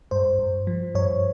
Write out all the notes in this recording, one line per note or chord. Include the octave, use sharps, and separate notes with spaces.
G2 C5
G2
F3
G2 C#5